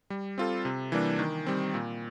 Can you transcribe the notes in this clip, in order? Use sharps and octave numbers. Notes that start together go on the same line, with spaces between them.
G3
C4 F4 A4
C3
E3 G3 A#3 D4
D#3
G3 C4
A#2